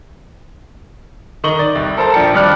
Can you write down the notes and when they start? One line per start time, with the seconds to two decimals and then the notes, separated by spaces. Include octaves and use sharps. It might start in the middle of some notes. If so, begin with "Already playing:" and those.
1.44 D#3 D#4 D#5 C#6 F#7 G7
1.59 D5
1.75 C2
1.97 A4 A#4 C5 A5 A#5
2.14 A#1 F3 D4 G5 C#7
2.34 G#1 G3 D4 D6 F6 F#6